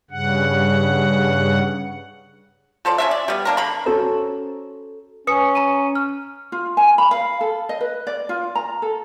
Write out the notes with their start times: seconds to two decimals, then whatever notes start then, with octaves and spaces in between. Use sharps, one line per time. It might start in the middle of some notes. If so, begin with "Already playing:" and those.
0.11 G2 C#3 F#5
2.85 F3 A4 C5 D5
2.98 C#4 D4 E5
3.11 D5
3.28 G3 B3
3.45 A#3 D4 A#4
3.57 D3 A#5 B5
3.86 C#4 F#4 A4 C5 A#5
5.27 C#4 B4 D#6 C#7
5.55 A#5 D#7
5.95 F6
6.52 F4
6.77 G#5
6.98 B5
7.11 F5
7.41 A4
7.69 D#5
7.81 B4
8.07 D5
8.29 F4
8.55 A#5
8.82 A4